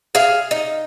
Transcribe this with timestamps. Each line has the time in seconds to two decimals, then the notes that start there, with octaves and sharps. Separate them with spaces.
0.15 G#4 E5 F5
0.51 D#4